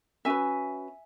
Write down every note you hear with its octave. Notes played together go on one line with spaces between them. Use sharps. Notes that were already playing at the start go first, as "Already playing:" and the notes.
C#4 F#4 B4 E5 G#5